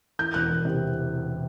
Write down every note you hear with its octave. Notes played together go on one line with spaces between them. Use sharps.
E3 G6
E1 F#6
E2
C3